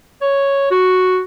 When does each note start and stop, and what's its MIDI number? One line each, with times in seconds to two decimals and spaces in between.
0.21 0.69 73
0.71 1.21 66